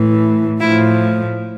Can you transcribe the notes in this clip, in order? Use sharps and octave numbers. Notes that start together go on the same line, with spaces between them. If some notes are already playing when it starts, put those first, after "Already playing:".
Already playing: A2 E3
A2 F3 E4